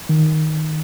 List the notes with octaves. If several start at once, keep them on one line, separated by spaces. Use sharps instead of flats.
D#3